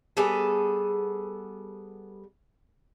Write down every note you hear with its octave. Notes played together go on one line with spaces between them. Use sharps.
G3 B3 G#4 A4